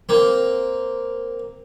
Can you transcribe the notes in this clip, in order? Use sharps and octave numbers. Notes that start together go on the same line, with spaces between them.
A#3 C4